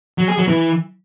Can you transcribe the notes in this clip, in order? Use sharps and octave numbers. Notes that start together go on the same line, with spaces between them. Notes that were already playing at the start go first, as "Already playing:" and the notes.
F#3
G#4
F#3
E3